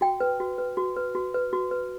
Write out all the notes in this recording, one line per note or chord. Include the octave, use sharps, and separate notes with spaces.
F#4 G5
B4
F#4
B4
F#4
B4
F#4
B4
F#4
B4